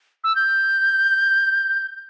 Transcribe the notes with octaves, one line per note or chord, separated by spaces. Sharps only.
E6
G6